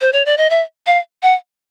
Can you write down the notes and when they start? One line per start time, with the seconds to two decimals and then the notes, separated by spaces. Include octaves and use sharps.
0.01 C5
0.13 C#5
0.26 D5
0.37 D#5
0.50 E5
0.86 F5
1.23 F#5